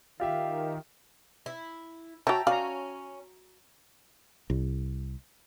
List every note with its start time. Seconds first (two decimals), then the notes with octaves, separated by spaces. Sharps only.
0.20 D#3 F4 G4 E5 F5
1.46 E4
2.27 F#4 A4 C#5 E5 G5 A#5
2.47 C#4 F#4 D5 F5 A#5
4.50 C2